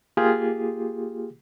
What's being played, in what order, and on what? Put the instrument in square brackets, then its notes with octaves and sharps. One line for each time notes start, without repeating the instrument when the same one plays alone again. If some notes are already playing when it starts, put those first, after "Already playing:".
[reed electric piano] A#3 F4 G4 G#4